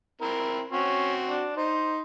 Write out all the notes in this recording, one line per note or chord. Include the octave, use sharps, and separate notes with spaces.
C4 E4 A#4
C4 C#4 F#4
D4
D#4 C5